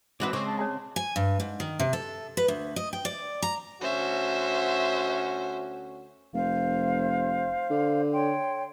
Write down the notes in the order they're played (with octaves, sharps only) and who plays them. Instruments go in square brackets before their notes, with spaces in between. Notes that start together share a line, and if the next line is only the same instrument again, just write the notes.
[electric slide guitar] E3 G#3 E4 [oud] C4 F#4 B4 [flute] D6
[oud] C#3 C4 [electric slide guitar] G#3 [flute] C#6 [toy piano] D6
[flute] A5
[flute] G#4 [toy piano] C#5 A5
[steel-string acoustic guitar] G#5
G2
G#2
D#3
C3
A4
B4
D2
D#5
G5
D5
A#5
[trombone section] D2 C#4 F#4 [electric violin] C5 E5
[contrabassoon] F1 [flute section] C5 F5
[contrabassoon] D3
[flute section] C#5 G5 C6